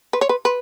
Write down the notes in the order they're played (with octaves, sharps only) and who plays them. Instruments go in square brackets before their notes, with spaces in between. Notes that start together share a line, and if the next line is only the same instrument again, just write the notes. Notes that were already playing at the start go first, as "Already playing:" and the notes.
[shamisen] B4
C#5
B4
B4